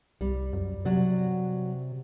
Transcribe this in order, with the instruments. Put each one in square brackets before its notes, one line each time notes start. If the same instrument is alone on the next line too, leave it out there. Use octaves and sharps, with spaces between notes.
[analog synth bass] C2 [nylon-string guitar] G3
[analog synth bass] F#2
[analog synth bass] C3 [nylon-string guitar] F#3 F#4 D5